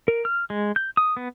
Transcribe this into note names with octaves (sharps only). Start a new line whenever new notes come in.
A#4
F6
G#3
G6
D#6
B3